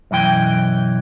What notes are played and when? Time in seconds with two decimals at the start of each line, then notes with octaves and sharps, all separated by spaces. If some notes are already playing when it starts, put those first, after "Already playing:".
0.11 B1 F#2 E3 G5